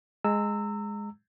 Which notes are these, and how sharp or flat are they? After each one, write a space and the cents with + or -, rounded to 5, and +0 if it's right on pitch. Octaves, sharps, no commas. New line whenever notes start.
G#3 +0 A#5 -30 E6 +0